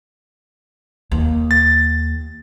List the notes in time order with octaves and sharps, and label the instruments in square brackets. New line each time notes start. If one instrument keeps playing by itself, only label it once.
[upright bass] D#2
[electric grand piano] A6